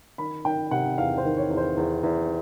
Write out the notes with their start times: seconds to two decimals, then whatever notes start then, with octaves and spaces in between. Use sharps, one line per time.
0.18 D#3 B5
0.45 D#3 G5
0.71 C3 F#5
0.98 E2 F5
1.18 C5
1.24 D#3
1.37 C#5
1.50 E2
1.57 C5
1.77 E2
2.03 E2